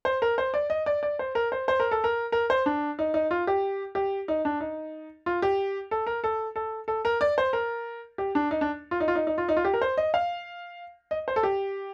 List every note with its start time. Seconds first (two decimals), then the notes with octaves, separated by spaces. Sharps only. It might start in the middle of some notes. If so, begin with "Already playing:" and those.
0.05 C5
0.22 A#4
0.38 C5
0.54 D5
0.70 D#5
0.86 D5
1.03 D5
1.19 C5
1.35 A#4
1.52 C5
1.68 C5
1.80 A#4
1.91 A4
2.04 A#4
2.32 A#4
2.50 C5
2.66 D4
2.99 D#4
3.14 D#4
3.31 F4
3.47 G4
3.95 G4
4.28 D#4
4.45 D4
4.60 D#4
5.26 F4
5.42 G4
5.91 A4
6.07 A#4
6.24 A4
6.56 A4
6.88 A4
7.05 A#4
7.21 D5
7.38 C5
7.53 A#4
8.18 G4
8.35 D4
8.51 D#4
8.61 D4
8.91 F4
9.00 D#4
9.08 F4
9.15 D#4
9.27 D#4
9.38 F4
9.49 D#4
9.57 F4
9.65 G4
9.74 A#4
9.82 C5
9.97 D#5
10.14 F5
11.11 D#5
11.28 C5
11.36 A4
11.43 G4